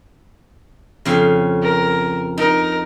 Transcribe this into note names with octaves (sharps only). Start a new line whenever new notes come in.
F2 C#3 F5
A#4
D#4 A#4